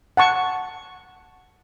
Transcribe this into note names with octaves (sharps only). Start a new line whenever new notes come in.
F#5 A5 C#6